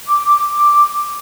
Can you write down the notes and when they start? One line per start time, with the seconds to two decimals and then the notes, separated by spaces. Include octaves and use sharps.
0.06 D6